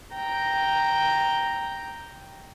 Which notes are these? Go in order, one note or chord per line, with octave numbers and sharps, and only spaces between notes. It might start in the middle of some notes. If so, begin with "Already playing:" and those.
G5 A#5